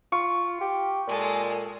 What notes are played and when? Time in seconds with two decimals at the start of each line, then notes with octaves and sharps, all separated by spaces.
0.12 F4 C#6
0.61 G4
1.07 A#2 G#3 A4